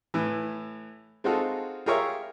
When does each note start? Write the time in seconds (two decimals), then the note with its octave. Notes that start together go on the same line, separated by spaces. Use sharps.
0.14 A2 E3
1.24 G#3 C4 D#4 F4 F#4 A4
1.86 F4 G4 G#4 A#4 C#5 E5